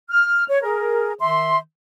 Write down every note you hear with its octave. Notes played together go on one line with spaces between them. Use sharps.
F6
C#5
G#4 A#4
D#3 E5 C6